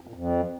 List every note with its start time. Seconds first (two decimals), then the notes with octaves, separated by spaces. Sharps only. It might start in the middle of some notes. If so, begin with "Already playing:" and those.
0.01 F2
0.07 A#2
0.14 F2